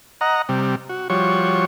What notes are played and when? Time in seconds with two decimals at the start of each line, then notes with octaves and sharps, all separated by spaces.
0.21 D#5 F#5 A#5
0.49 C3 G3
0.89 F#4
1.10 F3 G3 F#4 C#5 C#6